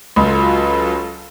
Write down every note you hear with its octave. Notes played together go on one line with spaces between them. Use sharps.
C#2 F#3 F4 A4